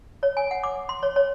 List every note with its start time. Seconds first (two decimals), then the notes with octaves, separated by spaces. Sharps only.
0.23 C#5
0.37 G#5
0.51 F#5
0.63 D6
0.89 C6
1.03 C#5
1.16 C#5